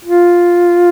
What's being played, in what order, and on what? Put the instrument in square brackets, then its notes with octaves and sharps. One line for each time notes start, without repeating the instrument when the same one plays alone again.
[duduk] F4